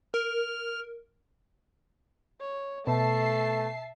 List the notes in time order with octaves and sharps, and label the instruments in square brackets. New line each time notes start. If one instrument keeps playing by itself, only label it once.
[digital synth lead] A#4 [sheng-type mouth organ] F6
[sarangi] C#5
[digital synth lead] B2 [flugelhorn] A3 [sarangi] E5 [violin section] A5 C7